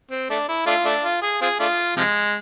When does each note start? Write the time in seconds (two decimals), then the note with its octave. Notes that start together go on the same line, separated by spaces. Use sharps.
0.11 C4
0.30 A3 D4
0.49 E4
0.66 A3 D4 F4
0.85 A3 D4
1.04 F4
1.22 G#4
1.41 C4 F4 G#4
1.60 A3 D4 F4
1.97 C3 F3 G#3